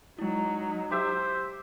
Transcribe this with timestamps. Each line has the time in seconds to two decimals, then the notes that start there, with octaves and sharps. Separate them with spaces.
0.19 F#3 G#3 D#4 E4
0.91 G4 C5 E5 E6